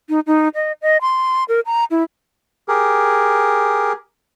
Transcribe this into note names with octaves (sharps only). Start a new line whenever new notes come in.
D#4
D#4
D#5
D#5
C6
A#4
A#5
E4
G4 G#4 A#4